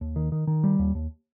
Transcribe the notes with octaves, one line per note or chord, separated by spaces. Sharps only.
D#2
D#3
D#3
D#3
G3
D#2
D#2